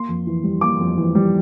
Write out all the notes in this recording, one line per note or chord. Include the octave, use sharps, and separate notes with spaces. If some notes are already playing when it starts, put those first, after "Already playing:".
Already playing: A#3 C6
F2
E3
G3
A#3 D6
F2
E3
G3